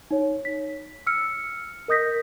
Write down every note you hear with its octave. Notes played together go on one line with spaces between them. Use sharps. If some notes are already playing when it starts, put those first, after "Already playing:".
D#4 C#5
B6
E6 F6 C#7
A#4 D#5 D#6 G6 A#6 B6